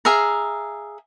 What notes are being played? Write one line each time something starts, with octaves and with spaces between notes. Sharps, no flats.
G#4 E5 F5 A#5